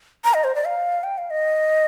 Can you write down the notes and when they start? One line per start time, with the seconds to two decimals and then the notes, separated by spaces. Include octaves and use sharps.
0.24 A#5
0.34 D#5
0.44 C5
0.55 D5
0.65 F5
1.03 G5
1.18 F5
1.30 D#5